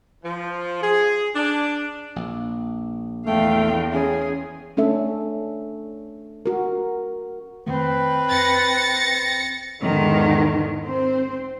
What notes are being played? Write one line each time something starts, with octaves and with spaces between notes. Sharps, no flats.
F3
G#4
D4
A#1
E2 A3 F5 G5
C#4 G#4
A3 C#4 D4 A4 E5
F#4 A#4
F2 D#3 A3 C4 B4
F2 A6 A#6 C#7
E2 G#2 D3 D#3
C4 C5